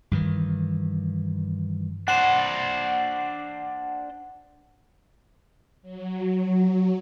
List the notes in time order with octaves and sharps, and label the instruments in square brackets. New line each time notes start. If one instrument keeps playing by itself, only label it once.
[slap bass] G2 D#3 E3
[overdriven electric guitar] D4 C5 [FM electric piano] F#5
[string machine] F#3